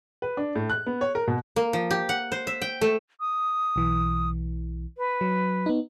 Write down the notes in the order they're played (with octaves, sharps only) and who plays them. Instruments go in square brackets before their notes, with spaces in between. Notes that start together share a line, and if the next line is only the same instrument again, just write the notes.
[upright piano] B4
D4
A2
F#6
B3
C#5
A#4
B2
[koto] A#3
F3
G4
F#5
C5
E5
G5
A3
[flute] D#6
[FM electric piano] B1 E3
[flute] B4
[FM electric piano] F#3
B3 D#4